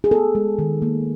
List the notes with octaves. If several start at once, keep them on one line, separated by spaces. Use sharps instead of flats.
G#4
B3 A4
G#3
D#3
A#3